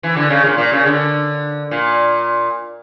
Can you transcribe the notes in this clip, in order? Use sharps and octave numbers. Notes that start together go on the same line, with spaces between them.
E3
D3
C#3
A#2
A#2
C#3
D3
A#2